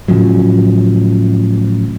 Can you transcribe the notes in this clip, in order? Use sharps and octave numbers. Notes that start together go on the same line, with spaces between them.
A2 C#3 F3 F#3